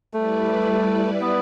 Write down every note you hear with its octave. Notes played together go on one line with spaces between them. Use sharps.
G3 A3 E4 B4 D5
B3